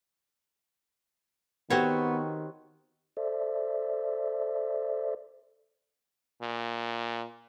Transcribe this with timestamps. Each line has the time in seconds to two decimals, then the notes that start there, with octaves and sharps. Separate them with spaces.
1.70 D#3 B3 C4 F#4 G4 C#5 G5 C#6
3.17 A4 C5 D5 E5
6.42 A#2